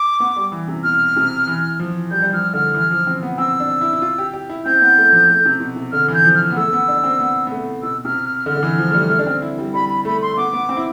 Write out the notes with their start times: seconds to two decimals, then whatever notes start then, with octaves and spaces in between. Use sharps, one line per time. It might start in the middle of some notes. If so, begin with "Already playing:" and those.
Already playing: D6
0.20 B3
0.36 G3
0.52 E3
0.68 C3
0.84 B2 F6
1.16 C3
1.47 E3
1.80 F3
2.11 G3 G6
2.22 G3
2.33 F3 F6
2.53 D3 F6
2.74 E3
2.91 F3
3.07 C4
3.23 B3
3.38 C4 E6
3.60 D4
3.81 E4
3.93 E4
4.02 F4
4.18 G4
4.34 G4
4.49 E4
4.66 C4 G6
4.81 B3
4.98 A3
5.12 F3
5.29 A3
5.45 C3
5.60 B2
5.76 C3
5.92 D3 F6
6.08 E3
6.14 G6
6.24 F3
6.35 F6
6.51 B3
6.56 A3 E6
6.73 B3
6.88 D4
7.04 C4
7.20 B3
7.47 B3
7.51 A3
7.83 B2 E6
8.05 C3 F6
8.25 F6
8.46 D3 F6
8.56 D3
8.63 E3
8.78 F3
8.90 A3
8.94 G3
9.10 A3
9.19 D4
9.27 C4
9.42 E4
9.58 G3
9.74 G3 B5
9.90 B5
10.05 A3 B5
10.22 C6
10.31 A3
10.37 B3 D6
10.53 B3
10.69 C4
10.77 E4